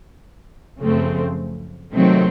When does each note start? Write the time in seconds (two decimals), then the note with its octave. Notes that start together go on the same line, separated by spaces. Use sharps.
0.79 F#2 C#3 F3 A3 C4
1.92 C3 D#3 F#3 A3 C4